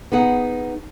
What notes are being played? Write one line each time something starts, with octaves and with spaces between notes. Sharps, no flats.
B3 D#4 G#4 F#5